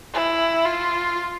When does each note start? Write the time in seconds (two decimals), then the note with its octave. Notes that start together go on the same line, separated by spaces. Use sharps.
0.13 E4
0.66 F4